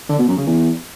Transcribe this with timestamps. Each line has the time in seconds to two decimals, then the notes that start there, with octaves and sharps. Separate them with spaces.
0.09 D3
0.18 B2
0.28 F#2
0.37 C#3
0.47 E2